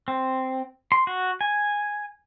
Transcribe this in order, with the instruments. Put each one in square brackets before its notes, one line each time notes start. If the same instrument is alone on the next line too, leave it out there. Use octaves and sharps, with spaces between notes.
[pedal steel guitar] C4
C6
F#4
G#5